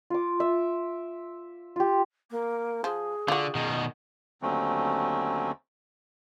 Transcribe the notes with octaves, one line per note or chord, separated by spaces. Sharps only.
F4 D6
E5
F4 G4
A#3
F3 G#4
D3 F4 F#4
B2 D#3
D#2 D3 F#3 A3 C4 C#4